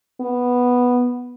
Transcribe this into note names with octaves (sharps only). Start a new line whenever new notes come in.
B3